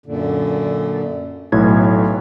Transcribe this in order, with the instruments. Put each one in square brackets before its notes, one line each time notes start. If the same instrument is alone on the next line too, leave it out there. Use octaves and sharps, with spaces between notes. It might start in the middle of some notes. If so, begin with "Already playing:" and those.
[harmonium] F#2 A#2 D3
[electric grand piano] B1 A2 G#6 [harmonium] E3